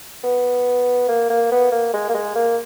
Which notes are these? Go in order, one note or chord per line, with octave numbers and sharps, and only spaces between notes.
B3
A#3
A#3
B3
A#3
G#3
A#3
G#3
A#3